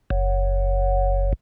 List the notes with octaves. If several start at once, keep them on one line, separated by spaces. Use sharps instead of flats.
F#1